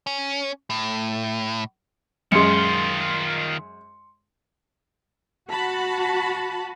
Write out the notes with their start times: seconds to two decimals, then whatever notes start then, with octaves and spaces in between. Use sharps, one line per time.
0.07 C#4
0.70 A2
2.32 F#2 D#3 G#3 F4 C6 C#7
5.51 F#4 A5 B5